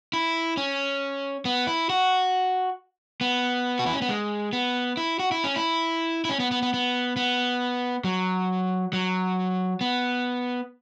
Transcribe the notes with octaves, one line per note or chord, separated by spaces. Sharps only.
E4
C#4
B3
E4
F#4
B3
F#4
E4
C#4
B3
G#3
B3
E4
F#4
E4
C#4
E4
E4
C#4
B3
B3
B3
B3
B3
F#3
F#3
B3